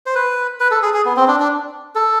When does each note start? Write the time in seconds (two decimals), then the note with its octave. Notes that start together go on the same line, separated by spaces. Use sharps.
0.06 C5
0.15 B4
0.60 B4
0.71 A4
0.82 G#4
0.94 G#4
1.05 B3
1.17 C4
1.28 D4
1.40 D4
1.95 A4